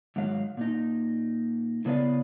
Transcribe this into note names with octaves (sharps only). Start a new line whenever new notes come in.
G#2 D#3 F#3 F5
A#2 D#4
A2 C#3 B3 B4 D5 F5